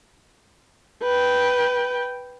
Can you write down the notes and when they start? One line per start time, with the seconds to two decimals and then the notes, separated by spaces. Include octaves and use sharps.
1.03 B4 G5